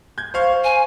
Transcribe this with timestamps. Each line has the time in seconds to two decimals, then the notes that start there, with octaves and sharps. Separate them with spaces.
0.18 G6 G#6
0.34 C5 F5 C#6
0.63 G#5